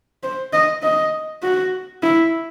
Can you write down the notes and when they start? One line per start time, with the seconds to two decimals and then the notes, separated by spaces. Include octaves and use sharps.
0.23 C5
0.53 D#5
0.83 D#5
1.43 F#4
2.02 E4